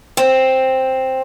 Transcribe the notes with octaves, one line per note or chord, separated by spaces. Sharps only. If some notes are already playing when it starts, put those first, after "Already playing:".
C4